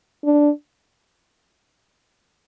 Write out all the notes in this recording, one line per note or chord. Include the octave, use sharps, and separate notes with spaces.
D4